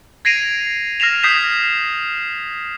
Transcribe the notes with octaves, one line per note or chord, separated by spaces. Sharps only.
G#6 A#6 C7 D7 D#7 F7
F6 A#6 C7 E7 F7
D#6 G6 B6 C7 E7